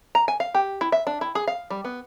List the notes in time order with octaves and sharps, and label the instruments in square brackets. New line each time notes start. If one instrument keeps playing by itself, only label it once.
[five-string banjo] A#5
G#5
F5
G4
E4
E5
D4
E4
G#4
F5
G3
B3